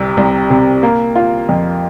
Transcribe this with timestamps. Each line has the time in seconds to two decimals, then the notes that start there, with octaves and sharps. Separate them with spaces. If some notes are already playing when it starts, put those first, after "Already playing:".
Already playing: C2 C3
0.17 C2
0.50 C3
0.83 A#3
1.16 F4
1.49 F2